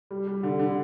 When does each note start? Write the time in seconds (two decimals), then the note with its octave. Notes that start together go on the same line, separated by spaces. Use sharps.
0.11 G3
0.27 G3
0.43 D3
0.59 D3